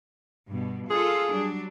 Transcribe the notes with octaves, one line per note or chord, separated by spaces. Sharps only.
G2 B2
F4 G#4 A4 F5
F#3 G3 D4